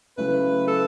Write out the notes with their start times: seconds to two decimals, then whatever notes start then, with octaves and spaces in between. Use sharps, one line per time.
0.17 C#3 F#3 A3 C#4 E4 B4
0.68 A4